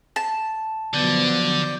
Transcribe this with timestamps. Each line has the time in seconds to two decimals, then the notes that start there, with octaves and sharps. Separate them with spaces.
0.16 A5
0.94 D3 F3 F#3 B3 D5 G6